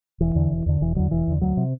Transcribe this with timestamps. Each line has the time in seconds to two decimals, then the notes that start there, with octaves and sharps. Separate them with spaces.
0.21 E1 E3
0.35 E2 D3
0.51 E1
0.66 E2 D3
0.81 E1 E3
0.96 E2 D3 F#3
1.11 E1 E3
1.27 E2 D3
1.41 D2 F#3
1.57 C3